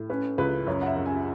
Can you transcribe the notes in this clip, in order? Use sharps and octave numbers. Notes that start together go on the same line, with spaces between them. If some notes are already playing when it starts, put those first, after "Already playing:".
Already playing: A2
C#4 B4
C#2 B4
F#2 C#5
F#5
E5
F#2
G#5